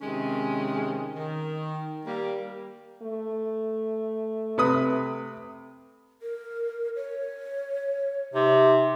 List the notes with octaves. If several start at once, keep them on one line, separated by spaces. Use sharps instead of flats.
C3 D#3 G#3 C#4
D#3
G3 A#3
A3
C3 B4 D#6
A#4
C#5
C3 D#4